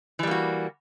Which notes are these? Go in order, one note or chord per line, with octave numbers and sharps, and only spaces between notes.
E3 G3 A#3 F#4